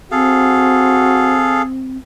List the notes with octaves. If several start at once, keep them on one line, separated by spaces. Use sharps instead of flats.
C4 F#4 G#4 A4 F5